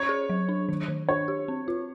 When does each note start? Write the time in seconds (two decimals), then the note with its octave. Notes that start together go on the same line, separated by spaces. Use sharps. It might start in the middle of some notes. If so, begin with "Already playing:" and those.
Already playing: C#4 C#5
0.09 G#4
0.30 F#3
0.49 D4
0.69 D#3
0.88 D#3
1.09 D4 C#5
1.28 G4
1.48 C4
1.68 F4